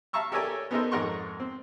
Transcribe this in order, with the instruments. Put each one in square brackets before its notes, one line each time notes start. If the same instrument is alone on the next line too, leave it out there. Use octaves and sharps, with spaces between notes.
[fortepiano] E5 F5 A5 A#5 C#6 E6
G4 A4 A#4 C#5 D5 G#5
B3 C#4 D#4 A4 A#4 C5
F2 G#2 A#4 F#5 C6 C#6
C4